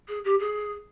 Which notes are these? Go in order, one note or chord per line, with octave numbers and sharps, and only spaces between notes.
G#4
G4
G#4